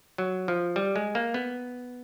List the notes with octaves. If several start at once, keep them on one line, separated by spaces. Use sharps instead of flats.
F#3
F3
G3
G#3
A#3
B3